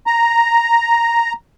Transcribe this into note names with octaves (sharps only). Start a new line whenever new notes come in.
A#5